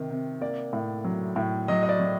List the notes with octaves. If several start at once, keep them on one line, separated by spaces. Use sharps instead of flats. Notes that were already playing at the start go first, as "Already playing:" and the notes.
Already playing: C3 D#3
C3
A#3 D5
A2
F#3
A2
F#3 D#5
D#5
D5
F#3